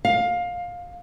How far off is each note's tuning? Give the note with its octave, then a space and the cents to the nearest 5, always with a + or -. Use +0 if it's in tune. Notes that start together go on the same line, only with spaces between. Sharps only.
F5 +20